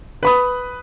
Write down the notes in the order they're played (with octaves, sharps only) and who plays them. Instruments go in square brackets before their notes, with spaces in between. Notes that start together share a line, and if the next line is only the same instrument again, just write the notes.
[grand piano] B4 B5 D#6